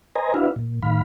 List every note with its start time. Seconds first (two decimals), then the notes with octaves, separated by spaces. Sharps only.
0.15 B4 C5 D#5 G#5 A#5
0.34 D4 E4 F#4 B4 E5 F5
0.56 A#2
0.83 A2 D#3 F5 B5